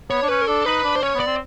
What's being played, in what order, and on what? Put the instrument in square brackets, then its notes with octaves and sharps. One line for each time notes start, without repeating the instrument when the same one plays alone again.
[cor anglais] B3 [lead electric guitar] C#5
[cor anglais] D4
[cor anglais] C#4 [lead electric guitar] B4
[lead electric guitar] A#4
[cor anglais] D4 [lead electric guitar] A4
[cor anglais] D#4 [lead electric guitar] B4
[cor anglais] D4
[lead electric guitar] C5
[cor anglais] C#4 [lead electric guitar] C#5
[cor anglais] B3
[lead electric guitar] D5
[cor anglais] C4